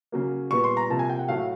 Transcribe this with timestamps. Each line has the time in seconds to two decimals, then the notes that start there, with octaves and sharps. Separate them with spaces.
0.12 C#3 F#3 A#3
0.51 A#2 G3 B3 C#6
0.64 C6
0.77 A#5
0.90 C3 F3 A#3 A5
0.99 G#5
1.10 G5
1.19 F#5
1.28 A2 F#3 A3 F5